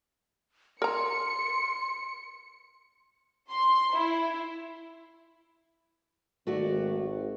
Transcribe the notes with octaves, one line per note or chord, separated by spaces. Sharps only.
A#4 A#5 C6 C#7
C6
E4
G#1 A3 F#4 D5